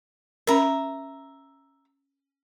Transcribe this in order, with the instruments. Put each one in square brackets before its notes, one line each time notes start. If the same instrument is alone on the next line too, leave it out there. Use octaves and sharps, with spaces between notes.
[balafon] C#4 A#4 [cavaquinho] E5 A#5